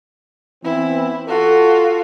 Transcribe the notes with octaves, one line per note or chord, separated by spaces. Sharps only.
E3 B3 C4 E4
F4 F#4 A4